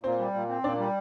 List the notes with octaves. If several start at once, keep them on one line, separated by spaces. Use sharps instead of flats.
A#2 C4 C5
G3
A#2
C4
A#2 D4 D5
G3